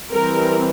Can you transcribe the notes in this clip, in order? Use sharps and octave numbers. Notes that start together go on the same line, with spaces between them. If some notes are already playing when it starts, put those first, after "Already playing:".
E3 G3 C4 A#4